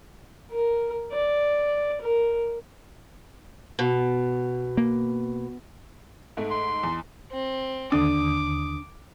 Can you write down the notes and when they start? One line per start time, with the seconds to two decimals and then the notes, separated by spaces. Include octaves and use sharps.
0.51 A#4
1.12 D5
2.01 A#4
3.79 B2
4.77 A#3
6.37 G#2 A3
6.51 C6
6.83 E2
7.31 C4
7.92 D#2 D3 D4 D6 D#6